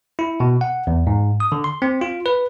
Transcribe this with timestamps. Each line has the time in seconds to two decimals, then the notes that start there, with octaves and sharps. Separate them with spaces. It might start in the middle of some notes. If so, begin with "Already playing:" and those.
0.19 E4
0.40 B2
0.61 F#5
0.87 E2
1.07 G#2
1.40 D#6
1.52 D3
1.64 C6
1.82 C4
2.01 F4
2.26 B4